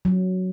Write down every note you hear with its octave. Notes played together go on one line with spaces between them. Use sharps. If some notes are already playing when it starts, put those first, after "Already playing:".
F#3